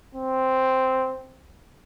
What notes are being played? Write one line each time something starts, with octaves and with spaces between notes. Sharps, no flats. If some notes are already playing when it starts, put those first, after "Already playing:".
C4